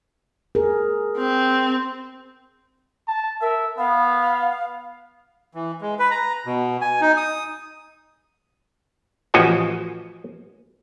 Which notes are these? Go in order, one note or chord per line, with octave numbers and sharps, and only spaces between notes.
G#4 A#4
C4
A5
A#4 E5
B3 F5
E3
G#3
B4
A#5
B2
G#5
D#4
D#6
A1 F3 F#4 D#5 G#5